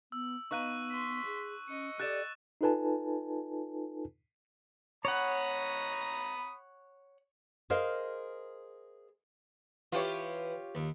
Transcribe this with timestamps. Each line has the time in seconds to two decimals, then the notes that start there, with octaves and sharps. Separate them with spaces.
0.12 B3 E6
0.51 B3 D#4 B4 F5 C#6 F#6 D#7
0.91 C6 B6
1.25 G#4
1.68 C#4 D#5 C#7
1.99 G4 A4 D5 F#6 A6 E7
2.61 D#4 F4 A4 B4 G#5 A5
5.05 C#5 F#5 A#5 B5 D#6
7.70 G#4 A#4 C5 D#5 F5
9.92 E3 F4 G4 C#5
10.75 D#2